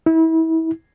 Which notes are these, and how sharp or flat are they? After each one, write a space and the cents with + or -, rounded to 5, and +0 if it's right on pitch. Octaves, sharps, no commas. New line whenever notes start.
E4 -30